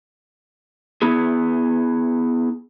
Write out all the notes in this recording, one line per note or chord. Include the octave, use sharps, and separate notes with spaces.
B3 E4 G#4